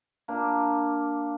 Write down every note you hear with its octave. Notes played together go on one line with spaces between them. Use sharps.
A#3 D4